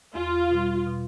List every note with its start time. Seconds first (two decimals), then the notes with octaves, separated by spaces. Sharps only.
0.15 E2 F4
0.51 B2 G3
0.87 B2